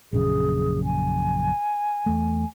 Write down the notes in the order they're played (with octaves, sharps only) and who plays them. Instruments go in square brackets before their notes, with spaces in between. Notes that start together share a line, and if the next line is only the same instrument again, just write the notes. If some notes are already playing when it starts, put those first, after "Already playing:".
[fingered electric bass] A#1 F#2 C#3 [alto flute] G#4
[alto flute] G#5
[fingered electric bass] E2 A3